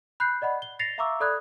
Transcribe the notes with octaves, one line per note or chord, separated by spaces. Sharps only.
B5 F#6 G6 C7
D5 D#5 F#5 B5
G7
A6 A#6 C7 C#7 F7
E5 F5 A#5 C#6 D6 E6
A4 D5 B5 D#6 F#6 G#6